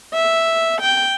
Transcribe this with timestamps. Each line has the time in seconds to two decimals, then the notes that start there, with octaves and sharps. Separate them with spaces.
0.14 E5
0.81 G5